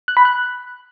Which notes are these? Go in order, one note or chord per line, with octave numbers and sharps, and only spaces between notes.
F#6
B5
F#6